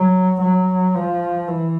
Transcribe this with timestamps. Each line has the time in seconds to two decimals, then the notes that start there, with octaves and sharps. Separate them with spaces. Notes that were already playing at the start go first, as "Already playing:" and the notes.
Already playing: F#3
0.41 F#3
0.94 F3
1.48 E3